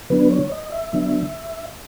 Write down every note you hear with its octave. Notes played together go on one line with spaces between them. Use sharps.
D3 F#3 B3 D4 B4
C#5
D#5
E5
D3 F#3 B3 D4